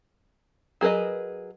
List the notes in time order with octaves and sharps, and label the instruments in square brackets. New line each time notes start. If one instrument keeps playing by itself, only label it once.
[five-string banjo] F#3 G#4 A#4 B4 D#5